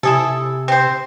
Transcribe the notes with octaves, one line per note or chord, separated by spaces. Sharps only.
C3 E4 G#4 A4
C4 C5